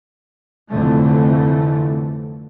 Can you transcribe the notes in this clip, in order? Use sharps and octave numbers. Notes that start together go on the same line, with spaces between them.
F1 F2 D3 E3 A3